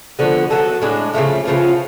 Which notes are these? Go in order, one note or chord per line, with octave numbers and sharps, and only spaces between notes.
D3 F3 B3 F#4
F#3 B3 F#4 A4
A2 G#3 D4
C#3 F3 A3 F4
C#3 F3 B3 F4